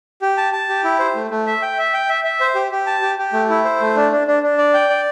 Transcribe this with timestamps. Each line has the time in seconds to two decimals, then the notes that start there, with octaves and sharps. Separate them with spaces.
0.22 G4
0.37 A5
0.53 A5
0.69 G4
0.84 E4
0.99 C5
1.15 A3
1.31 A3
1.47 E5
1.62 G5
1.78 E5
1.94 G5
2.09 E5
2.24 E5
2.40 C5
2.55 G4
2.72 G4
2.87 A5
3.02 G4
3.19 G4
3.33 A3
3.50 E4
3.65 C5
3.81 A3
3.96 D4
4.12 D4
4.27 D4
4.43 D4
4.58 D5
4.74 G5
4.89 D5